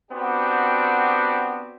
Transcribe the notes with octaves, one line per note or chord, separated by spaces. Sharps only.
B3 C4 D4 F#4 G4